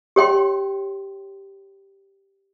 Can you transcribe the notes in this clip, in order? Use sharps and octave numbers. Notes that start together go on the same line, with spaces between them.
G4 C#5 G5 C6